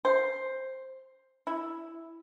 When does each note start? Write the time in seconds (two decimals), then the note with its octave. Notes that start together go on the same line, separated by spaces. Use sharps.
0.05 C5
1.47 E4